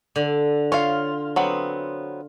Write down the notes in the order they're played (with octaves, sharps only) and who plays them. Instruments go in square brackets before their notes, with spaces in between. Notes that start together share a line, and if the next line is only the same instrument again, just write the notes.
[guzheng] D3
[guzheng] F4 [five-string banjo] C#5 F5
[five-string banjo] F#3 B3 C4